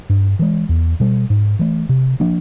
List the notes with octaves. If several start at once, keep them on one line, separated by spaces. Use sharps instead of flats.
G2
E3 G#3
E2
B2 G3
G#2
E3 A3
C3
F3 A#3 D4